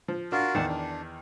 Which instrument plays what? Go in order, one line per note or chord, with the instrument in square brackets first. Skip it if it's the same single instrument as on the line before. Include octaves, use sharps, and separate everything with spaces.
[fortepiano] F3
[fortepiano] D4 [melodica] F4 F#4 A#4
[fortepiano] E2 D#3 [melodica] D4 F#5 A5
[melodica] D4